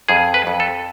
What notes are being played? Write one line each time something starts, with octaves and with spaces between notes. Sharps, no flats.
F2 G#4
B4
F2
A4